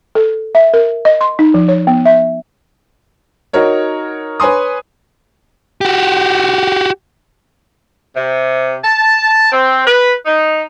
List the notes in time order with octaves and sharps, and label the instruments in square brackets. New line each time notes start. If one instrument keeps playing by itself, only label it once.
[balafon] A4
E5
A#4
D#5
C6
D#4
F3
C#5
B3
E5
[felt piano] D#4 F#4 A#4 C#5
B4 C#5 G#5 C6 D#6
[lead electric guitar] F#4 G4
[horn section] C3
A5
C4
B4
D#4